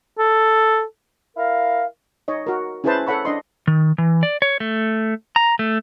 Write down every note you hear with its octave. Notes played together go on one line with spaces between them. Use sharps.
A4
E4 A#4 F5
D#4 C#5 D#5
F#4 A#4
C#4 E4 G#4 B4 C5 A5
A4 C#5 F#5 B5 C#6
D4 D#5 C6
D#3
E3
D5
C#5
A3
A#5
A3